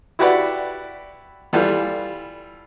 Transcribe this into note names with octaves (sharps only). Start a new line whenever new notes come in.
E4 F#4 G4 B4 D5 F#5
E3 G3 F4 A4